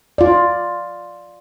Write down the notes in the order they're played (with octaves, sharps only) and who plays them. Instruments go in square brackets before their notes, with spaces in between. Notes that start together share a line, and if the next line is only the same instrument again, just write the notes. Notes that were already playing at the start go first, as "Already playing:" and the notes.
[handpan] F4 D5